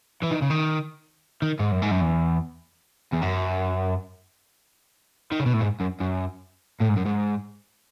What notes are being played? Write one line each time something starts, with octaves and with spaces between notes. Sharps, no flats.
E3
D#3
C#3
D#3
D#3
G#2
F#2
G#2
F#2
E2
E2
F#2
D#3
C#3
B2
A2
G#2
F#2
F#2
A2
G#2
F#2
G#2